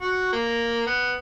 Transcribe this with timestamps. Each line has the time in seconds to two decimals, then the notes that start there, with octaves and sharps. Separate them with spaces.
0.01 F#4
0.33 A#3
0.87 B3